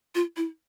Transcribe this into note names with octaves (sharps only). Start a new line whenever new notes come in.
F4
E4